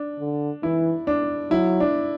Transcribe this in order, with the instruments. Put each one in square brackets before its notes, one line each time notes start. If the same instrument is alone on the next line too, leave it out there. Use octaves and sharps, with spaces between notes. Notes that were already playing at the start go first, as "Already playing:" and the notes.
Already playing: [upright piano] D4
[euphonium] D3
[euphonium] E3 [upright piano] E4
[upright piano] D4
[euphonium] F#3 [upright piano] E4
[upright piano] D4